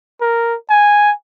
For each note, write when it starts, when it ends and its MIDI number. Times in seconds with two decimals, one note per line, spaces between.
0.21 0.55 70
0.70 1.12 80